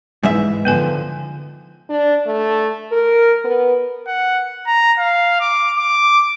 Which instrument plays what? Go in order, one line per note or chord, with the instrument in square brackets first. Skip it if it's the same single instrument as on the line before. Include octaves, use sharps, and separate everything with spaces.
[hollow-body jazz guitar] G#2 G#3 E5 [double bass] E3
[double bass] D3 F3 [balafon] B3 B4 G#5
[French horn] D4
A3
A#4
B3
[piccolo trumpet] F#5
A#5
F5
D6
D6